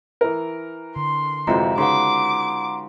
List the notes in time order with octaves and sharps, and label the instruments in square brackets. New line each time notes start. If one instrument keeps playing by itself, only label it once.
[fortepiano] E3 A#4
[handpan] D3 [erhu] C6
[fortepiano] F2 C3 E3 [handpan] G#3 F4 F#4 [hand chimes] A#5
[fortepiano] C#3 [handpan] D#4 B4 [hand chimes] F#5 A#5 C6 [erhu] D6